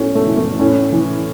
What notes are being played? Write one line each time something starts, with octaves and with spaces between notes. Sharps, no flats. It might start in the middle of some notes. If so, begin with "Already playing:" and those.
Already playing: A2 C#4 F#4
A3
E3
A3
A2 C#4
E3